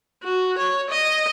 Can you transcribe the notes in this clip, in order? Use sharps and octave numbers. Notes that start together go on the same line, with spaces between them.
F#4
C#5
D#5